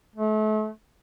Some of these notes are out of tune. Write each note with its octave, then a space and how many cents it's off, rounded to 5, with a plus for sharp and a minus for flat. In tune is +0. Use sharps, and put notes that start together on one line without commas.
A3 -35